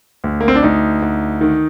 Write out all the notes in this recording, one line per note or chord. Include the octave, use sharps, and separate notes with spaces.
D2
A#3
C4
D4
D2 D#4
D2
D#3